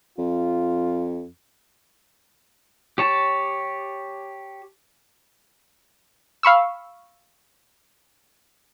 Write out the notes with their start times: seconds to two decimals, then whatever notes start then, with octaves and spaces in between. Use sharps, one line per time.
0.18 F2 F4
2.98 G4 C#5 A5
6.43 F5 B5 C#6 E6